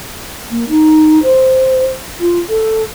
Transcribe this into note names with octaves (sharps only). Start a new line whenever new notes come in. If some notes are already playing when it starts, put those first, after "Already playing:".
A#3
D#4
C5
F4
A4